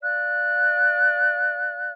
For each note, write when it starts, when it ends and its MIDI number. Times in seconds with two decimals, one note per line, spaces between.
0.03 1.92 74
0.03 1.92 77
0.03 1.92 90